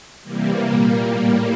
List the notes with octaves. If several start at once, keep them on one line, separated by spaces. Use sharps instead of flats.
C3 E3 G3 A#3
A#2 G3 A#3
A2 G3